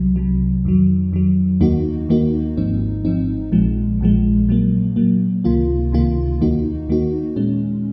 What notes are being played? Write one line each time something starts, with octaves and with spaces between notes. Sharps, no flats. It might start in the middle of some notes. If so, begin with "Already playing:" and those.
Already playing: C2 C3 F#3
C2 C3 F#3
F2 D#3 F#3
F2 D#3 F#3
D#2 D#3 A#3 D#4 F#4
D#2 D#3 A#3 D#4 F#4
G#1 G#2 F3 C4 D#4
G#1 G#2 F3 C4 D#4
A#1 A#2 F3 G#3
A#1 A#2 F3 G#3
A#2 F#3 A#3
A#2 F#3 A#3
C#2 C3 D#3 A#3 F4
C#2 C3 D#3 A#3 F4
D#2 D#3 A#3 D#4 F#4
D#2 D#3 A#3 D#4 F#4
A#2 G#3 C#4